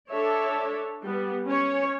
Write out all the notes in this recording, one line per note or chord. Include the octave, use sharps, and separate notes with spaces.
D4 A4 C#5 D5 E5
G3 B3
C#4 C#5